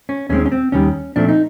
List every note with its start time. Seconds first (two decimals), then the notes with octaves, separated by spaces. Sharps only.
0.09 C#4
0.29 D#2 D#3 G#3 C4 C#4
0.46 C#4
0.52 C4
0.72 D#2 D#3 G3 C#4
1.16 A#2 F3 A3 C4 D4
1.29 D#4